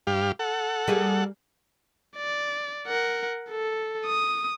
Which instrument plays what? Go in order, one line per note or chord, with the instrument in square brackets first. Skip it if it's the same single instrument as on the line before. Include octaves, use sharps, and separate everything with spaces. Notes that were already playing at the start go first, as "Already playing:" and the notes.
[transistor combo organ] G2 G4 F5
A4 F#5
[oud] G3 A#3 G#4
[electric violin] D5
A#4 F#5
A4
D#6